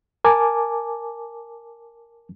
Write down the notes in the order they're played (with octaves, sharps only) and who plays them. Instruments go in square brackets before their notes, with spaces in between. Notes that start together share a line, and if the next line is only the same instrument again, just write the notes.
[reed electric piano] A#4 G#5 A5 D6